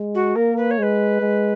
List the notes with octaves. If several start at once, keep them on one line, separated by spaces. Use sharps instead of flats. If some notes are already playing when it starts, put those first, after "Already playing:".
Already playing: G#3
F#4
A#3 A#4
B4
C#5
G#3 B4
G#3